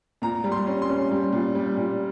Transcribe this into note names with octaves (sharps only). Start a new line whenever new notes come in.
A#2 A#5
G3
C6
C#4
C6
C#4
G3
A#2
G3
A#2